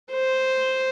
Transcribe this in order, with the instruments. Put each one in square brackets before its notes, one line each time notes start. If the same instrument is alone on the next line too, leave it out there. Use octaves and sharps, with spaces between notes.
[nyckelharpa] C5